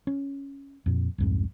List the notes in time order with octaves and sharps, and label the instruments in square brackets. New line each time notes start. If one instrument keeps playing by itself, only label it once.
[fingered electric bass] C#4
F2 A#2
C2 F2 G#2